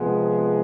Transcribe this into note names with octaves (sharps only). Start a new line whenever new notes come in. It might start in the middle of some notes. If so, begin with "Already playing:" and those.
Already playing: C3 F3 G#3 B3